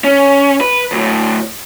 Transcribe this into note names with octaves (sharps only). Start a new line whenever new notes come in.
C#4
B4
D2 A2